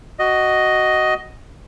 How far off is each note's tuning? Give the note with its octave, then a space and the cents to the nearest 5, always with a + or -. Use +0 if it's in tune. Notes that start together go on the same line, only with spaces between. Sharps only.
F#4 +10 D#5 +0